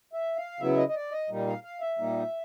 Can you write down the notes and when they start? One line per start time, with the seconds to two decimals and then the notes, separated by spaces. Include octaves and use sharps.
0.13 E5
0.37 F5
0.60 C#3 F#3 B3 E4 E5
0.77 D#5
0.89 D#5
0.95 D5
1.11 D#5
1.30 A#2 G3 A#3 D#4
1.47 F5
1.63 F5
1.81 E5
1.98 A#2 G3 A#3 D#4